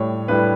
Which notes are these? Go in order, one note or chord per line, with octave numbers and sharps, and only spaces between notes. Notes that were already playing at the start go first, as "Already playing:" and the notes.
Already playing: A2 G3 C#5
A2 G3 B4